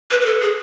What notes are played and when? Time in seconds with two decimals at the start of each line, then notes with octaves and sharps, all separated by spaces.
0.11 B4
0.21 B4
0.26 A4
0.41 G#4